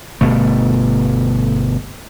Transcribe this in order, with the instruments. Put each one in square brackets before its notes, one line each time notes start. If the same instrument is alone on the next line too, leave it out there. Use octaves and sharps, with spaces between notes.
[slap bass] G1 B2 A3